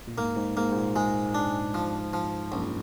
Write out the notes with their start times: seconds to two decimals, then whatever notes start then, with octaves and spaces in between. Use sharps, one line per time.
0.07 A#2
0.17 G#2 A#3
0.37 G#2
0.57 G#2 A#3
0.72 G#2
0.76 A#2
0.96 G#2 G#3
1.35 D4
1.74 F3
2.13 F3
2.52 A#1 F#2